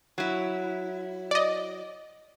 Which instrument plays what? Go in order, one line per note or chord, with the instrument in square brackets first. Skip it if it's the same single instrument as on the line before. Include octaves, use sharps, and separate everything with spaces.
[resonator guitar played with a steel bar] F#3 E4
[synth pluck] D5 D#5